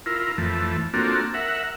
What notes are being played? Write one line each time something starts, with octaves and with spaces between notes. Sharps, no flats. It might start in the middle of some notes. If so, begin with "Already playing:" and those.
E4 F4 A#4
F2 E3 A3
A#3 C4 D4 F4 F#4 A4
A#4 E5 F#5